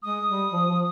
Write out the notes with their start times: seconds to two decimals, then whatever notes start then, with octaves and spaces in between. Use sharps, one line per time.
0.03 G#3 D#6
0.28 G3
0.52 F3
0.69 F3